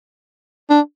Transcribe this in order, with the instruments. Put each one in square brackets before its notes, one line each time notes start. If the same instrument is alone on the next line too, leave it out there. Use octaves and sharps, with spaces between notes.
[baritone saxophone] D4